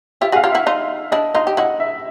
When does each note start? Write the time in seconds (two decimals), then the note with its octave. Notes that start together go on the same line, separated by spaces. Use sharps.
0.21 F4 G4 E5
0.32 F#4 G#4 F5
0.44 F4 G4
0.52 E4 F#4 E5
0.67 D#4 F4
1.12 D4 E4 D#5
1.34 D#4 F4 D#5
1.47 G4
1.57 E4 F#4 D#5
1.80 E5